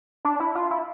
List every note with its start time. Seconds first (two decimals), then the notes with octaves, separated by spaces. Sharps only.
0.25 D4
0.40 E4
0.55 F4
0.71 E4